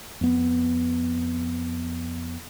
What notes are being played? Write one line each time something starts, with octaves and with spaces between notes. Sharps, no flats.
F2 B3